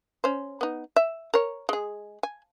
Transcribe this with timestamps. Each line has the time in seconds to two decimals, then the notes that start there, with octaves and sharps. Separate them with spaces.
0.24 C#4 C5
0.61 B3 D#4
0.96 E5
1.34 A#4 C#5
1.69 G#3 G#4
2.23 G#5